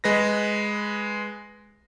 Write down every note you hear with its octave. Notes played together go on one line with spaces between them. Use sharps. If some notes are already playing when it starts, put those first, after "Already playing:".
G#3 B4 A#6